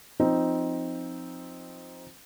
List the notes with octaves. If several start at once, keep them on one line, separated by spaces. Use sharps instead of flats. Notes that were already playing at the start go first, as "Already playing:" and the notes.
F3 C4 D#4